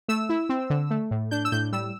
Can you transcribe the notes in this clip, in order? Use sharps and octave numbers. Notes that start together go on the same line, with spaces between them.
A3 E6
E4
C4
D3
A3
A2
D4 G6
E6
A2 G6
G3 E6